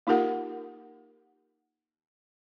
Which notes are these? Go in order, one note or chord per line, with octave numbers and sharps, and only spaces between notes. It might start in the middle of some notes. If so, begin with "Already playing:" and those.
A#3 D#4 F4 G4 A#4 F#5